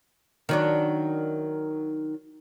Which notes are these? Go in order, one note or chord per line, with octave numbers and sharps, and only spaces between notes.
D#3 F#3 D4